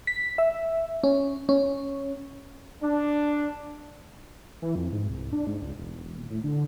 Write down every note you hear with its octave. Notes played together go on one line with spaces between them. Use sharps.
B6
E5
C#4
C#4
D4
E3
F2
G#2
C2
D4
G#2
C#2
E1
E1
D#1
A2
D3